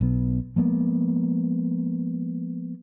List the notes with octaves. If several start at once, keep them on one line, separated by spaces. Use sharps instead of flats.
B1 B3
F3 G#3 A#3 B3